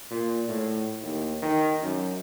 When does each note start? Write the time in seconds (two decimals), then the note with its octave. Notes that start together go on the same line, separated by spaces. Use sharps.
0.10 A#2
0.48 A2
1.02 D#2
1.42 D#3
1.82 F#2